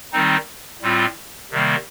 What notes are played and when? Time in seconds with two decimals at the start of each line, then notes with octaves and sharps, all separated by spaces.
0.12 D#3 G3 C4 D#4
0.82 A2 G3 C4 F4
1.51 C3 D#3 G3 A#3